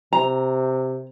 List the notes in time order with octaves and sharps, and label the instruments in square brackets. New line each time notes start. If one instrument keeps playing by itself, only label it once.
[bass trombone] C3 [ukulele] A#5